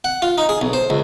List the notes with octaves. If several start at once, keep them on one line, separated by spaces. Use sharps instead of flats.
F#5
F4
D#4
G#4
B1
C5
C#2